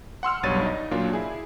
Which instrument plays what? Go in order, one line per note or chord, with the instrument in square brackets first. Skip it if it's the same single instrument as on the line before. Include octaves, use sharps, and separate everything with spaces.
[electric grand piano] F#5 C6 E6 F6
B1 G2 D4 C#5 A6 D#7
D#4 D#5
A#2 F#3 A#3 D4 F4
E4 G#4